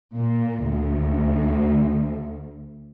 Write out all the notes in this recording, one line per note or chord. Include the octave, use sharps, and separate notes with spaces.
A#2
D2